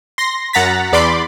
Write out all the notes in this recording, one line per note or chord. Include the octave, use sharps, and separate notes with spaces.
C6 A#6
F#2 F#5 A#5 A6 B6
E2 D5 B5 C6 D6